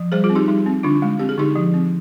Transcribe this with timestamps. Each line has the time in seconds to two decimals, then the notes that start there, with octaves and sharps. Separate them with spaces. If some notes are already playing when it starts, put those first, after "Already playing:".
Already playing: F3
0.12 G3 G#4 C5
0.24 F4 G#4
0.30 C4
0.35 D#4 G4
0.48 G3 D#4
0.66 C4
0.83 D3 D4 F4
1.02 G#3
1.19 C4 G4
1.29 G#4
1.38 D3 D#4 G4
1.56 F3
1.74 C4